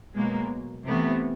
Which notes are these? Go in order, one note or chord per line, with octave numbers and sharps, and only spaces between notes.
B2 F#3 G#3 A#3
C3 E3 A3 B3